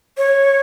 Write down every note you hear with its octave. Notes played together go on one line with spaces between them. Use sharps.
C#5